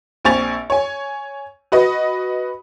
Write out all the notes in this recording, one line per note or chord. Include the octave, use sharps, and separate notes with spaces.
A#1 C4 G#5 C#6 A6 F7
C#5 G#5
F#4 B4 D#5